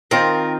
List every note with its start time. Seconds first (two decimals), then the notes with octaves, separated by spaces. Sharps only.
0.11 D#3 C4 F4 A#4